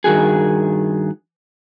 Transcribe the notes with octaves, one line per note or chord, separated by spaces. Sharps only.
G2 D#3 B3 F#4 G#4